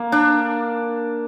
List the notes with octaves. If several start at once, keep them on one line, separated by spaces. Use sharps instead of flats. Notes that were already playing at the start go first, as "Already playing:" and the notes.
Already playing: A#3
D4